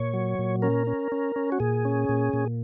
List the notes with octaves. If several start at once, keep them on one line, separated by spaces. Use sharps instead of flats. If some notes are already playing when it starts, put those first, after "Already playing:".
Already playing: A#2 C#5
F#3
A#2
C#4 A#4
C#4
C#4
C#4
F#4
A#2 G#4
C#4
A#2
A#2